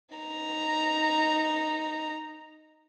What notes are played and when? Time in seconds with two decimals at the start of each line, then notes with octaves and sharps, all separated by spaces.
0.15 D#4 A#5